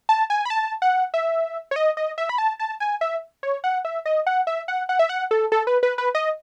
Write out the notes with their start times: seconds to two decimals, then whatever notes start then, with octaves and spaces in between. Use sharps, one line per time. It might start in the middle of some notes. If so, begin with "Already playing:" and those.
0.09 A5
0.30 G#5
0.45 B5
0.50 A5
0.82 F#5
1.14 E5
1.71 C#5
1.76 D#5
1.97 D#5
2.18 E5
2.29 B5
2.38 A5
2.59 A5
2.80 G#5
3.01 E5
3.43 C#5
3.64 F#5
3.85 E5
4.06 D#5
4.27 F#5
4.47 E5
4.68 F#5
4.89 F#5
4.99 E5
5.09 F#5
5.31 A4
5.52 A4
5.67 B4
5.83 B4
5.98 B4
6.15 D#5